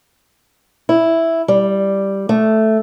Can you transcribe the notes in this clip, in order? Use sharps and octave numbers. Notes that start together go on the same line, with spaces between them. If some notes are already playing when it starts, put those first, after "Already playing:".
E4
G3
A3